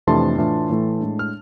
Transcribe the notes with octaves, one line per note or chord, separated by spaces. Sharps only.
F2 C3 E3 A3 D4 A5 C6
A2 E3 A3 D4 F4
A2 E3 A3
A2 G#3 D4
F6